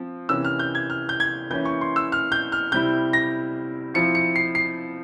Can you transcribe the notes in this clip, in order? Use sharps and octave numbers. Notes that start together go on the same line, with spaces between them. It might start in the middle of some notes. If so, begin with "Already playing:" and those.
Already playing: F3 C4
C3 E3 A#3 C#4 E6
F6
G6
G#6
F6
G6
G#6
E3 A#3 C#4 E4 G6
C#6
C6
E6
F6
G6
F6
C3 G3 C4 E4 G6
A#6
F3 C4 E4 C#7
C#7
C7
C7